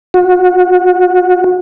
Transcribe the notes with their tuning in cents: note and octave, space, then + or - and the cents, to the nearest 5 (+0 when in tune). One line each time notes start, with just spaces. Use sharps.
F#4 -30